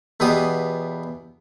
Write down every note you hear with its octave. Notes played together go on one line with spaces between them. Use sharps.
E2 B2 B3 G4 D#6